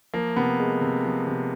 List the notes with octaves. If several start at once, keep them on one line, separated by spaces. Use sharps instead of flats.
F3 A#3
C3 B3
G#3
C3
F3
C3